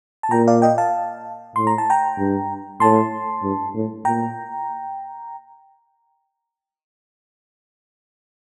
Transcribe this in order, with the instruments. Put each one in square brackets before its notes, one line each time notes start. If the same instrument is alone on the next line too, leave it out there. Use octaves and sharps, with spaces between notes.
[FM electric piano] A5
[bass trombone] A#2 [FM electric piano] G5 A#5
[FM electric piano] D5 F5
D#5 G5
F5 A5
[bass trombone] A2 [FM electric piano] C6
[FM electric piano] A#5
A5
G5 A#5
[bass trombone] G2
[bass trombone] A2 [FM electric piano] A5 C6
[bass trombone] G2
A2
[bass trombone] A#2 [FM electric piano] G5 A#5